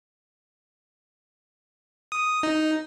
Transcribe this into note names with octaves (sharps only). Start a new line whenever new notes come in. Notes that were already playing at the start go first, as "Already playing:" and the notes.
D#6
D#4